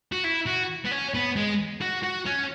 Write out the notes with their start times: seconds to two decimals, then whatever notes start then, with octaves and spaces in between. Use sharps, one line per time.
0.12 F#4
0.25 E4
0.47 F#4
0.85 B3
0.92 C#4
1.14 B3
1.36 G#3
1.82 F#4
2.04 F#4
2.26 C#4